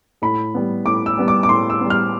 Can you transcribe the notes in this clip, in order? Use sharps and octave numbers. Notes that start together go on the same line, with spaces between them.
A2 B5
G3 B3
A2 D6
E6
G3 B3
D6
D6
A2 C6
E6
G3 B3
F6